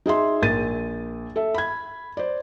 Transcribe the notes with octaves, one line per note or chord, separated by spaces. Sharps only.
D#4 G#4 E5 C6
A#1 A#4 A6 D#7
A4 E5
B5 G#6
C5 D5